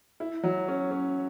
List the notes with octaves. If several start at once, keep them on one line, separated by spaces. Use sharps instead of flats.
E4
F#3
C#4
C#4